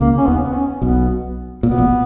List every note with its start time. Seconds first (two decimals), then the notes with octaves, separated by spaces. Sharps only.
0.01 C#2 C#3 A#3
0.18 C#4
0.27 D#2 D#3 B3
0.43 B3
0.55 C#4
0.82 B1 B2 B3
1.63 A#2 B3
1.71 B2
1.78 A#1 A#2